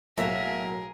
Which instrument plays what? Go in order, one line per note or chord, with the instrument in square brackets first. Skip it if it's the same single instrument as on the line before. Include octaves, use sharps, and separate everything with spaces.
[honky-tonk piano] B1 A2 [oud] F#3 A#3 [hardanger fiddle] G#4 A#4 [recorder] E5